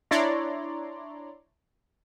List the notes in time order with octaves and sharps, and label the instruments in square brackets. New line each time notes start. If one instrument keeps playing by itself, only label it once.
[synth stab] D4 E4 C#5 D5 A#5 C6